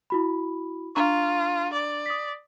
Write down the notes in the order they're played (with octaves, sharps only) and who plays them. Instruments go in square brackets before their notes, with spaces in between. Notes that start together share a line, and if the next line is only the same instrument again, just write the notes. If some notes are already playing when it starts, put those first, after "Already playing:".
[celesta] E4 F#4 B5
[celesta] D4 A#5 C#6 [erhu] F4
[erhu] D5
[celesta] D#6 B6